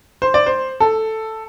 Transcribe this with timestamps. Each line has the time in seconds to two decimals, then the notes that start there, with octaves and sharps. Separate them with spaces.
0.22 C5
0.34 D5
0.46 C5
0.80 A4